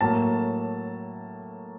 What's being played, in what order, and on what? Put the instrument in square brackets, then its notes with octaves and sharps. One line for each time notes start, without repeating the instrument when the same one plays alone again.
[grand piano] A2 F#3 A#3 A5